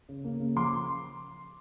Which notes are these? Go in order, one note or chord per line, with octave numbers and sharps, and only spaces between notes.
C#3
A#3
C#3
F3 C6 D6